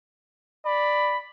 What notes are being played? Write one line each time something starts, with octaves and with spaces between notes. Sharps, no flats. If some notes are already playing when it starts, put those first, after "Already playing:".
D5 B5